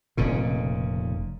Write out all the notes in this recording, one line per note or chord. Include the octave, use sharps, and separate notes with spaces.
F1 A#2 C#3